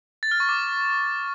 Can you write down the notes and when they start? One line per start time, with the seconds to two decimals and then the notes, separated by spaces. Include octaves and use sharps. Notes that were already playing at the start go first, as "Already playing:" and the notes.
0.23 A6
0.31 F6
0.40 C#6
0.49 D6